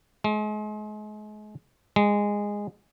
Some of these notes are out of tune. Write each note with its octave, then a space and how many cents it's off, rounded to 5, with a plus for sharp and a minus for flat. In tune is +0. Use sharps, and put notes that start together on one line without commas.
G#3 +35
G#3 -15